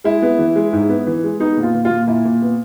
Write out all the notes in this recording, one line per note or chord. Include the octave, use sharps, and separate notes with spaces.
G#3 E4
B3
E3
G#3
G#2
B3
E3
G#3
B3 D#4
A#2
F4
A#2
F4
A#2
A#2 E4
A#2
B3